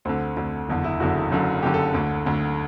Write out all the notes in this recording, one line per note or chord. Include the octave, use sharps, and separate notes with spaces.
D2 D3 C4
D2 D3
F#1 E2 D3
E4
F#1 E2 D3 F#4
F#1 F#2 D3
F#1 F#2 D3 G4
A4
D2 D3
D2 D3